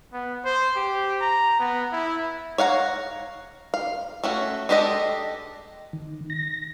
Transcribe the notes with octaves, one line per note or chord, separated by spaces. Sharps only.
B3
C5
G4
A#5
B3
E4
C#5 F5 F#5 A#5
F5
A3 C#4 F#4
G#3 D4 G4 A4 D#5
D#3
A#6